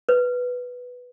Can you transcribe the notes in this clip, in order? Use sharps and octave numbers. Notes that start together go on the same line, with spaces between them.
B4